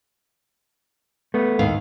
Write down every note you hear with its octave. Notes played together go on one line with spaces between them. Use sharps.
A3 B3
D#2 A2 F5